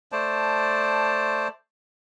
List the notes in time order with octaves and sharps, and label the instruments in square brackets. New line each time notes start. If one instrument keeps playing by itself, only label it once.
[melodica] A3 C5 D5 A5